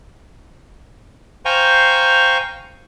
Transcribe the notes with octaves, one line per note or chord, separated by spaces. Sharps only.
C5 F5 G5 G#5 A#5 C#6